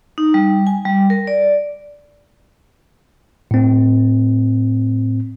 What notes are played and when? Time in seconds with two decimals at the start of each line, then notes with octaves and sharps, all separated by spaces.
0.18 D#4
0.34 G3
0.67 G#5
0.85 G3
1.10 A#4
1.27 D5
3.51 A2 C4